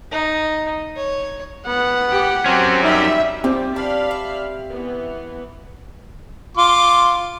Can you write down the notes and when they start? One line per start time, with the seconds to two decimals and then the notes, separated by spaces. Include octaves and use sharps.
0.11 D#4
0.96 C#5
1.67 B3 F#5
2.09 G4
2.46 F#3 C4 C#4 G4
2.83 G3 D#4 E5
3.44 G3 C4 F4 G4
3.76 D4 D5 F5 B5
4.11 E5
4.70 E3 B3
6.57 F4 C6 D6